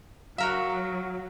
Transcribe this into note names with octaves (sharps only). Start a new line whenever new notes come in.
F#3 F#4 A#4 E5 F5